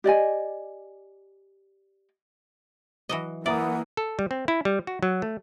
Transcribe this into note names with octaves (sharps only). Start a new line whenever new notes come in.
G4 D5 D#5 G#5
E3 F#3 D#5
E3 A#3 D5 E5 F#5 A#5 D#6
A4
G3
C4
E4
G3
F#4
F#3
A3